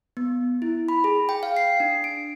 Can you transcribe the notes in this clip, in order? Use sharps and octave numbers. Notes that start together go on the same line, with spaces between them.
B3
E4
B5
G#4
G5
F5
C7
D4
D7